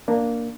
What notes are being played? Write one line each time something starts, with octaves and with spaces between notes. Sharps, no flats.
A#3 D4